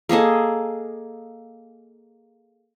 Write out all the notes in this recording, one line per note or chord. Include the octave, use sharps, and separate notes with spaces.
A#3 G#4 A4 D#5